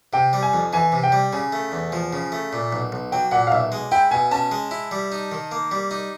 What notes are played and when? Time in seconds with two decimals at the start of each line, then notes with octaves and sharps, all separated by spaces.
0.13 C3 G5
0.33 G3
0.42 G#5
0.53 F2
0.73 E3 G#5
0.92 C3
1.03 G5
1.12 G3
1.33 C#3 G#5
1.52 A3
1.72 E2
1.92 F3
2.13 C#3
2.32 A3
2.53 A#2
2.72 B1
2.92 B1
3.12 F#3 G5
3.31 A#2 F#5
3.47 F5
3.51 B1 E5
3.72 G#3
3.92 E4 G5
4.11 B2 G#5
4.31 C#4 A5
4.51 G#3
4.71 E4
4.91 G3
5.12 D#4
5.32 D#3
5.51 A#3
5.71 G3
5.91 D#4